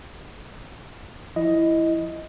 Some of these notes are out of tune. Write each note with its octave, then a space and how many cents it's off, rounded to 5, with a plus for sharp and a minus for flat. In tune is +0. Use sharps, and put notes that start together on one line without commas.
F3 +0 E4 +0 D#5 +5